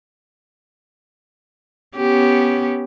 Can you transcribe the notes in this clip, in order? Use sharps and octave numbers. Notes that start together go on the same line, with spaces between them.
B3 C#4 G4